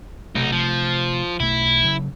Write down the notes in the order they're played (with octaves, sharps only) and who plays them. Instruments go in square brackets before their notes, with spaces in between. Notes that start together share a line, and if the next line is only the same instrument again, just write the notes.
[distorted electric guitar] B1 D#4 [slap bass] C3 A3
[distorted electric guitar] F3
[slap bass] B1 A3 [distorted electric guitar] E4
[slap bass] C#3 F#3